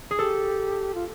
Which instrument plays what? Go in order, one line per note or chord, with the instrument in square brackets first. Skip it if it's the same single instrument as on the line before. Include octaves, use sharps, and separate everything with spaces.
[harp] G#4
[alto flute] G4 [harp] A4
[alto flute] F4